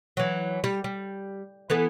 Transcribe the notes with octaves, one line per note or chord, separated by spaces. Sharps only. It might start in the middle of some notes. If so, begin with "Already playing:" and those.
E3 F#3
G3
G3
E3 B3 A4